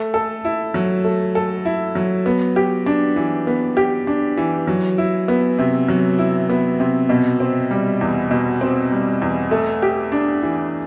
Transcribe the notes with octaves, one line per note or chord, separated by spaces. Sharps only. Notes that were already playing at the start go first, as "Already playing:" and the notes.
Already playing: A3
A4
E4
F#3
A3
A4
E4
F#3
B3
G4
D4
E3
B3
G4
D4
E3
F#3
E4
B3
C3
F#3
E4
B3
C3
B2
C4
G3
E2
B2
C4
G3
E2
A3
G4
D4
E3